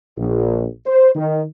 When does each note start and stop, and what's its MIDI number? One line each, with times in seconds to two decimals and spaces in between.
0.17 0.65 34
0.86 1.10 72
1.16 1.42 51